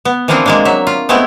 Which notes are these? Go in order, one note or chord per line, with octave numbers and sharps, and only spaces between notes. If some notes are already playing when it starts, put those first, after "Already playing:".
B3
E3 F3 A#3 C4 D4 F4
G#3 A#3 D4
F#3 E5
F4
G#3 A3 B3 C4 E4